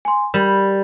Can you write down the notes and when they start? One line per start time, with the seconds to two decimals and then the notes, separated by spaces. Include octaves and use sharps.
0.05 G#5 C6
0.34 G3 A#4 B5